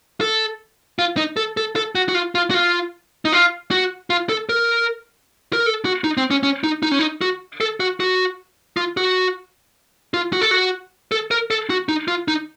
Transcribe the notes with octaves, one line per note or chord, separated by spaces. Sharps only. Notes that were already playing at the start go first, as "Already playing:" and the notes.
A4
F4
D#4
A4
A4
A4
F#4
F#4
F4
F4
F#4
F4
D#4
F4
F#4
F4
A4
A#4
A#4
A4
F#4
D#4
C4
C#4
C#4
D#4
D#4
C#4
D#4
F#4
A4
F#4
F#4
F4
F#4
F4
F#4
A4
F#4
A4
A#4
A4
F#4
D#4
F4
D#4